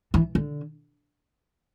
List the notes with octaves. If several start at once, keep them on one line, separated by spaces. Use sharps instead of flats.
E3
D3